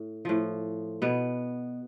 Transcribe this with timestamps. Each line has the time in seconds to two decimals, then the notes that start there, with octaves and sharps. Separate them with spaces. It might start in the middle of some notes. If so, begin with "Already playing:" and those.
Already playing: A2
0.25 A2 F3
1.02 B2 B3